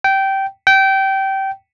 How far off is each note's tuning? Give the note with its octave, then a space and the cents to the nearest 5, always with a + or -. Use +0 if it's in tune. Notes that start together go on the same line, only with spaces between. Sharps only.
G5 -15
G5 -20